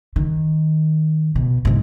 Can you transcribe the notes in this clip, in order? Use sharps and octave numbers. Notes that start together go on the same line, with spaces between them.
D#3
B2
B1 G#2